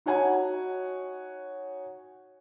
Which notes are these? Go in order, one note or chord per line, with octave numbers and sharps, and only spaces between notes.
D#4 F#4 C#5 F#5 G#5